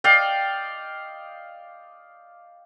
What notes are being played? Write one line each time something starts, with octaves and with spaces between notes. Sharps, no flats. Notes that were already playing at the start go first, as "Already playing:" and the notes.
D5 D#5 F5 G5